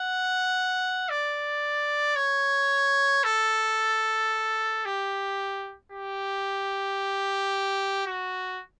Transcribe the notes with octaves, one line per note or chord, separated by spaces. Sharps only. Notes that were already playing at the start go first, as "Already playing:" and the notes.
Already playing: F#5
D5
C#5
A4
G4
G4
F#4